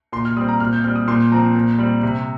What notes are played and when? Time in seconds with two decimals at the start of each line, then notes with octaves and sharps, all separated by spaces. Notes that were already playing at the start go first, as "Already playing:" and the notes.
0.12 A#2 C6
0.25 F6
0.37 G3 D#6
0.41 C4
0.48 A#5
0.60 A#2 F6
0.73 G6
0.84 G3 C4 F6
0.96 D#6
1.08 A#2 C6
1.32 F3 C4 A#5
1.55 A#2
1.79 G3 C4
2.03 C3